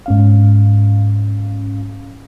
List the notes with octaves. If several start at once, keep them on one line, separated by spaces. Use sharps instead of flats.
G#2 C#4 F5